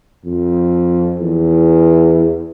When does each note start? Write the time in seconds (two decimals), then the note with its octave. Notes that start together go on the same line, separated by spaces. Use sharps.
0.25 F2
1.20 E2